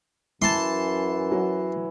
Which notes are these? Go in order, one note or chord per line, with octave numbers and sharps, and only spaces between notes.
F#2 E3 A5 C6
F#3